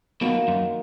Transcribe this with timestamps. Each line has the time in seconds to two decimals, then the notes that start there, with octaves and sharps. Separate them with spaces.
0.21 B1 B2 D#3 A#3 D#4 F#4
0.48 F#2